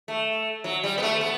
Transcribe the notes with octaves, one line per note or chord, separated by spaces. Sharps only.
A3
F#3
G3
B3
A3
B3